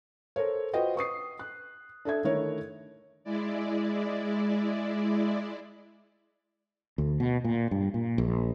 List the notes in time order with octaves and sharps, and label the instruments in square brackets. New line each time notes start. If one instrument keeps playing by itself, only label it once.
[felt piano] A4 A#4 C5 C#5
F4 F#4 B4 C5 D#5 G5
B4 C#6 D#6 C7
F#6
D4 A4 E5 G#6
D3 D#3 A3 E4 A#4 C#5
[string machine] G#3 E4 D5
[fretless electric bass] D2
B2
A#2
G2
A#2
A#1